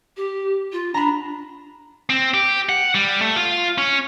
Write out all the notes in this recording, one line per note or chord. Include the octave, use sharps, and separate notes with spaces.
G4
F4
D4 A#5 B5
C4
G4
F#5
G3
A3
F4
C#4